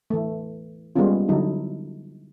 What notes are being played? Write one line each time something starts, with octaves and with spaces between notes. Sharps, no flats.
E3 A3
G3 G#3 A#3 B3 C#4 F4
D3 F#3 D#4 E4 A4